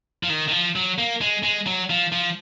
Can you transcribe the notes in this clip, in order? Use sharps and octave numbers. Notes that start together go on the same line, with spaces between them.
F3
D#3
D#3
F3
F#3
A#3
G#3
G#3
F#3
F3
F3